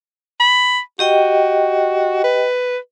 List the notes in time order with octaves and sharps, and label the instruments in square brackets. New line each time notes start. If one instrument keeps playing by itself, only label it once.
[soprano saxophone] B5
[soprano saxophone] F#4 [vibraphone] G4 D#5 G5
[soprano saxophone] B4